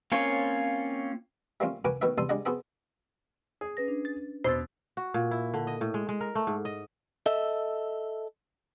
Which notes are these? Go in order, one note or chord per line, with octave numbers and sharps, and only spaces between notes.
A#3 C4 C#4 F4 C#5
G3 A3 A#3 C4 C#4 F4
F#4 A#4 B4 G5 G#5 D6
B2 D#3 A3 B4 C#5 E5
E2 G3 A4 A5 C6 D#6
G3 G#3 D4 D5 D#5 F#5
B3 F#4 G#4 A4 C5 G5
G#4
C#4 B4 A#6
D4
A6
E2 B2 C5 E6 A6
F#4
A#2
E4
D3
D#5
A2
G#3
G#3
A#4
A3
G#2
D#5
A4 D#5 E5